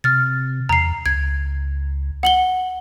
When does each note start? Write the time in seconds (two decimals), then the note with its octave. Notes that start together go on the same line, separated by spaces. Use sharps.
0.04 C3 F6 A6
0.69 E2 A#5 C7
1.06 C#2 G#6
2.23 F#5 F#7 G7